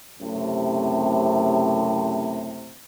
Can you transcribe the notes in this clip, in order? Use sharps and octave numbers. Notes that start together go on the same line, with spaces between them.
F#1 F#2 A2 C3